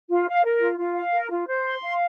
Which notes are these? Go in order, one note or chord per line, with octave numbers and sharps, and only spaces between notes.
F4
F5
A#4
F4
F4
F5
A#4
F4
C5
C6
F5